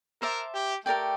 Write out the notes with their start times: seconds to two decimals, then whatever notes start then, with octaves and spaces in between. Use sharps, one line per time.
0.22 A#4 C5 E5 A5 D6
0.54 G4
0.85 A3 G4 A#4 D5 G5